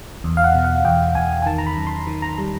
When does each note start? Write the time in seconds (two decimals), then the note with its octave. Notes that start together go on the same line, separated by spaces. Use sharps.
0.24 E2
0.37 F5
0.44 F#5
0.55 B2
0.64 F#5
0.85 E2 G5
1.15 E2 G#5
1.42 G#5
1.46 D#3 A5
1.58 A#5
1.67 B5
1.77 F#2
1.87 C6
2.07 D#3
2.22 A#5
2.38 G3 A#5